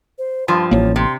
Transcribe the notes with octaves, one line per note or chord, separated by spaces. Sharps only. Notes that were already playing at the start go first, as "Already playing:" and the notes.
C5
G2 F3 C6
A1 A#3 C#5
C3 C6